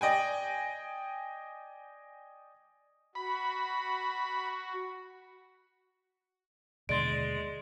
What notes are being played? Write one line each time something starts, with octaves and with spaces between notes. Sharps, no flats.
D5 D#5 G5 G#5
F#4 B5
D#2 B2 D3 G#3 D5 C6 A6 D7